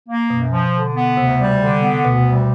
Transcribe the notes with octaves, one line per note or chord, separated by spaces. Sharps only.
A#3
F#2 B2
F3
D3
B3
D2 C3
G3
D3
B3
D2 B2
G3